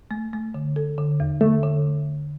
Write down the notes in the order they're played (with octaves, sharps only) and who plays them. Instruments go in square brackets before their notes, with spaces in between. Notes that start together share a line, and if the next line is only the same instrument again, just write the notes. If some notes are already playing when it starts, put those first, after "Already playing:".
[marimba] A3
A3
D3
A4
D3
E2
[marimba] D3 [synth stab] A3
[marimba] D3